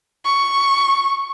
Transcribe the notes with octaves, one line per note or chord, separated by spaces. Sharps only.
C#6